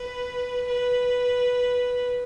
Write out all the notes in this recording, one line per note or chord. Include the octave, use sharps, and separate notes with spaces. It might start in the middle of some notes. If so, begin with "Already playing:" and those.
Already playing: B4
B4